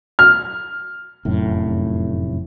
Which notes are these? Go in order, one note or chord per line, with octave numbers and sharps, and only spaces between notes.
F6
F1 F#2 A2